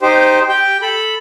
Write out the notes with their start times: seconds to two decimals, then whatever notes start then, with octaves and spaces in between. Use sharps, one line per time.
0.01 D#4 G4 C5
0.49 G4 G5
0.82 A4 B5